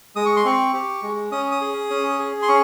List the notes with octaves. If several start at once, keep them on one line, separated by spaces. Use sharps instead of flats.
G#3 D#6
C#6
C6
C4 C#6
G4
G#3
C#4 D#6
D#6
G#4
C#4
G#4
C6
C#4 C#6